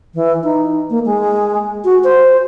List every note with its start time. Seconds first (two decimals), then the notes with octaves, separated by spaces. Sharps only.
0.14 E3
0.44 D#4
0.90 A#3
1.05 G#3
1.85 F#4
2.04 C5